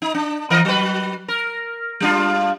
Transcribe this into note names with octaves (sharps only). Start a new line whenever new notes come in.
D#4
D4
E3 A#4 D#5
F#3 B4
A#4
G3 D4 F4